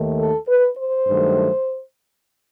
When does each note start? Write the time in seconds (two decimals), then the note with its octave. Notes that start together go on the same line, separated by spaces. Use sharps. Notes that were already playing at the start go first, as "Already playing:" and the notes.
Already playing: D#2 D#3 A3
0.18 A4
0.48 B4
0.77 C5
1.07 G2 D#3 F#3 A3